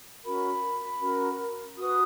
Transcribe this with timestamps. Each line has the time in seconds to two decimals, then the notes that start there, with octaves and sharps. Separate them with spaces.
0.24 C#4 F#4 A#4 B5
1.01 C#4 F#4 A#4
1.77 F#4 B4 D#6